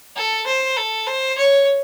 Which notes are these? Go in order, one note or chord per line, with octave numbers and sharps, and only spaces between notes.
A4
C5
A4
C5
C#5